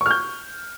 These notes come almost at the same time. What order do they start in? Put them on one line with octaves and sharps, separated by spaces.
C#6 F6 G6